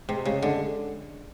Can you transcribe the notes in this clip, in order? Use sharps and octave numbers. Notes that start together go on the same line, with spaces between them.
C3 G#3
C#3 G#3
D3 G#3